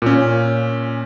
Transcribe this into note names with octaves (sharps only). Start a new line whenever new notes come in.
A#2 C#4